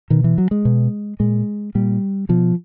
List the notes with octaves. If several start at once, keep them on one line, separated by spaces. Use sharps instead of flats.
B2 D#3
E3
F#3
G#3
B2
A#2 G#3
A#2 G3
B2 F3